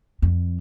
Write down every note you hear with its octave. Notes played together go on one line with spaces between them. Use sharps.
F2